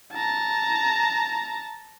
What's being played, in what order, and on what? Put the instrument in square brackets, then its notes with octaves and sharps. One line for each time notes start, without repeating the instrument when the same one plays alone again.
[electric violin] A5 A#5